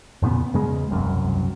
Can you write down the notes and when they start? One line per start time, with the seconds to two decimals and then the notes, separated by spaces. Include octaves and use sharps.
0.22 E2 A#2 C#3 B3
0.54 E2 C#3 G#3
0.91 E1 C2 F#2